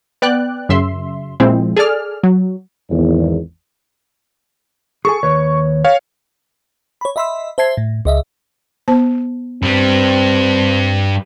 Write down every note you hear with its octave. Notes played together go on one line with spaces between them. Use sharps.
B3 D5 G5 F#6
F#2 C#3 E5 C6
A#2 F3 G#3 C4 E4
G#4 A4 D5 F6
F#3
G#1 E2
G#4 A4 G#5 C#6
D#2 B4 C#5
C#5 F5
C#5 B5
D#5 E5 B5 C6 E6
C5 E5 A5 G#6 C7
A2
C#2 D#5 E5
B3 C5 A5
G2 G3 C4